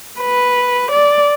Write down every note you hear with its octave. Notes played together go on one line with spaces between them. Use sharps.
B4
D5